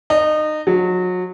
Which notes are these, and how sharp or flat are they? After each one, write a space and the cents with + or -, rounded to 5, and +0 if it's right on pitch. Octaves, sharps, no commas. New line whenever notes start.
D#4 -25
F#3 -30